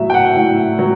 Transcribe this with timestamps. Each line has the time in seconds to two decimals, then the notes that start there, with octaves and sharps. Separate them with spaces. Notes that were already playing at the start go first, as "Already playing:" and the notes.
Already playing: A2 F#3 E5
0.10 G5
0.14 F#5
0.36 A2
0.79 F#3